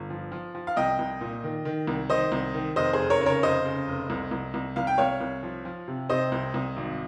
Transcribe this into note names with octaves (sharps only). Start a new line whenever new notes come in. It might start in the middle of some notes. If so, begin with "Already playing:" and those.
Already playing: G1
F3
F3
F3
F5
C2 D#5 G5
C2
A#2
D#3
D#3
C2
D#3 C5 D#5
C2
D#3
F1 C5 D#5
G#4 C5
F1
A#4 C#5
C#3
A#4 C#5
F1 C5 D#5
C#3
F1
C2
C2
C2
C2 F5
G5
C2 C#5 F5
C2
F3
F3
C3
C3 C5 D#5
C2
C2
G#1